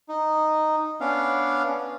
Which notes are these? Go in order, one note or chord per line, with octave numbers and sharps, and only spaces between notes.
D#4
B3 C#4 D4 F5